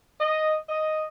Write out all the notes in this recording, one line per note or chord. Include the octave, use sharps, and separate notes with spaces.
D#5
D#5